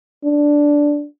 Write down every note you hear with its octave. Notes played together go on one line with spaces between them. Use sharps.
D4